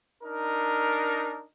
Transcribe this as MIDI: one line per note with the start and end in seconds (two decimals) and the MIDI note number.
0.24 1.45 62
0.24 1.45 63
0.24 1.45 70